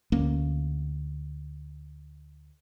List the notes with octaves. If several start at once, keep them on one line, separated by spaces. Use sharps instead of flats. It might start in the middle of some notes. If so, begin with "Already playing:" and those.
D2 A#3 C#4